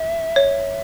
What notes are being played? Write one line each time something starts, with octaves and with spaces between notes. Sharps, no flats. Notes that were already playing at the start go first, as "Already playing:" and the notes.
Already playing: E5
C#5